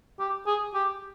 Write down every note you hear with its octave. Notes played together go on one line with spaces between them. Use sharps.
G4
G#4
G4